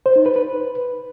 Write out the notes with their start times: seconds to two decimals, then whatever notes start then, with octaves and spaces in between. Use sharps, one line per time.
0.06 C5
0.16 D#4
0.26 B4
0.36 B4